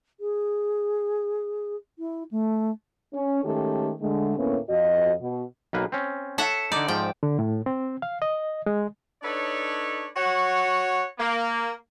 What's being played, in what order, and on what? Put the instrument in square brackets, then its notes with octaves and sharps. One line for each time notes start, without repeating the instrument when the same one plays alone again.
[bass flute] G#4
E4
A3
[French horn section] C#4
D#3 G#3 A3 C#4 G4 A4
D3 G#3 A3
D2 A2 A#3 B3 C#4
F2 F#4 D#5
B2
[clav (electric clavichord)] B1 A#3 B4
C4 C#4
[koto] A4 E5 F#5 [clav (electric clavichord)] C#5
[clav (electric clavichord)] D3 D#4 [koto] D5
[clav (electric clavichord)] G#2 F3 [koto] G5
[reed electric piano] D3
A2
C4
F5
D#5
G#3
[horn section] D4 D#4 A4 B4 C#5
F#4 C#5 F#5
A#3